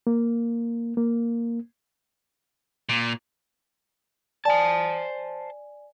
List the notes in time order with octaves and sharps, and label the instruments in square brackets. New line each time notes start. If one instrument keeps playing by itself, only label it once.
[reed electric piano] A#3
A#3
[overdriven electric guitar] A#2
[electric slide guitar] C5 A5 [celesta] D5 G#5